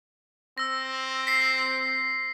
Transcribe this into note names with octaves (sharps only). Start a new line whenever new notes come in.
C4 E6 A#6
B6 C7